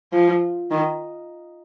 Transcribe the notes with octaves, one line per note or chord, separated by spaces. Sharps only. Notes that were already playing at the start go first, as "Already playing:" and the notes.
F3
D#3